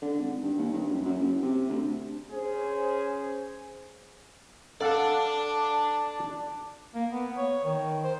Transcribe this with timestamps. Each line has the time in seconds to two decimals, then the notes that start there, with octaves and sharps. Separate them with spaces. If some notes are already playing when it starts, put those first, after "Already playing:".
0.02 D3
0.18 G#1
0.42 G2
0.58 D#2
0.73 G2
0.90 F#2
1.06 F#2
1.19 F#1
1.42 C3
1.69 D2
2.32 C#4 G#4 C5
4.81 D4 A4 D5 F5 F#5 A5
6.95 A#3
7.11 B3
7.37 C#5
7.65 D#3
8.04 C5